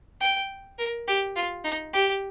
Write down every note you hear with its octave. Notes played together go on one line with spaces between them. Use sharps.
G5
A#4
G4
F4
D#4
G4